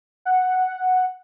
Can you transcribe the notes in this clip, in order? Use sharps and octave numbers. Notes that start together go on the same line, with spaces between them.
F#5